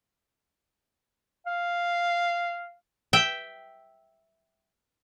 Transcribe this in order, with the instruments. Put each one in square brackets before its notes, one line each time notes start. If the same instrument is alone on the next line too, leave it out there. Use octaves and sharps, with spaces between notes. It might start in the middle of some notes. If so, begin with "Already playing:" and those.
[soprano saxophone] F5
[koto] E5 G5